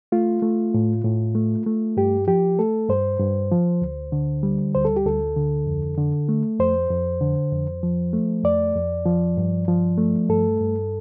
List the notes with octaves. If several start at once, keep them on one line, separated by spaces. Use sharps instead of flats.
A3 F4
A3
A2
A2
A3
A3
G2 G4
F3 G4
A3 A4
G2 C5
G2
F3
D2
D3
G3
D2 C5
A4
G4
D2 A4
D3
F2
D3
A3
F2 C5
F2
D3
F2
F3
A3
F2 D5
F2
F3
G2
F3
A3
G2 A4
G2